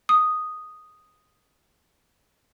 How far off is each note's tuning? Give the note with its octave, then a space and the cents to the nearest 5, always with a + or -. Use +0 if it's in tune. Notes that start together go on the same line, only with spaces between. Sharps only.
D#6 -5